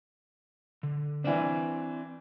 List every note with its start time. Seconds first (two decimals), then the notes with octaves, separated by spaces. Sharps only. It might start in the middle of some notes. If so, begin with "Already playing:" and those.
0.83 D3
1.24 E3 C4 D4 C5 D5